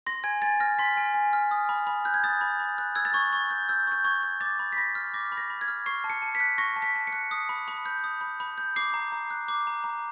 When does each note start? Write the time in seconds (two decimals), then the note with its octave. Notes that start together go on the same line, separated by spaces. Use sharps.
0.06 C6 A#6
0.24 G#5 G#6
0.42 G#5 A6
0.60 F6 A#6
0.79 C6 B6
0.97 G#5
1.14 G#5
1.33 F6
1.51 D#6
1.69 B5
1.87 B5
2.05 F#6 G6
2.14 G#6
2.24 D#6 A6
2.41 B5
2.60 B5
2.78 F#6
2.95 E6 G#6
3.05 A6
3.14 C#6 G#6
3.33 C#6
3.51 G6
3.69 E6 G6
3.87 C#6 G6
4.04 C#6 G#6
4.23 G6
4.41 D6 A6
4.59 B5
4.72 B6
4.77 B5 A#6
4.95 F6
5.14 D6 A#6
5.32 B5
5.37 A#6
5.50 B5
5.61 G#6
5.68 F6
5.86 C#6 C7
6.04 A5
6.10 C#7
6.22 A5
6.35 B6
6.40 F#6
6.58 C#6 A#6
6.76 A5
6.82 B6
6.95 A5
7.07 C#7
7.13 F#6
7.31 D#6
7.49 B5
7.68 B5
7.86 G6
8.04 D#6
8.21 B5
8.40 B5
8.58 G6
8.76 D6 C7
8.94 A#5
9.12 A#5
9.31 F#6
9.48 D6
9.67 A#5
9.84 A#5